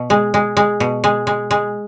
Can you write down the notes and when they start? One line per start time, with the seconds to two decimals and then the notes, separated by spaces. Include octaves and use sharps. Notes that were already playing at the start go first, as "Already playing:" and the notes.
Already playing: B2
0.10 G#3
0.34 G#3
0.57 G#3
0.80 B2
1.04 G#3
1.27 G#3
1.51 G#3